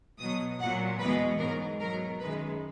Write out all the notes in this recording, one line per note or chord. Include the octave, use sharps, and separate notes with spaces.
B2 F#3 D#6
A#2 F#3 F#5
E2 B2 G#3 B4
G#2 F#3 A#4
B2 F#3 A#4
F#2 D#3 G#3 B4